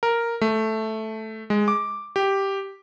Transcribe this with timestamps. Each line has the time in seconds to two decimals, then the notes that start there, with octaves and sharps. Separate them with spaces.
0.03 A#4
0.41 A3
1.50 G#3
1.68 D6
2.16 G4